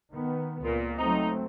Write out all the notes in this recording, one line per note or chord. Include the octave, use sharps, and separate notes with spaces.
D#3 B3
C#2 A#2
F#3 A3 C4 D#4